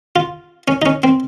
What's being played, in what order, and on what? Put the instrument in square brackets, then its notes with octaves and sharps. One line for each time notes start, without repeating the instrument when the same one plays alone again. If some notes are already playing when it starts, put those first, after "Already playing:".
[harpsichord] F4
C#4
D#4
C#4
C4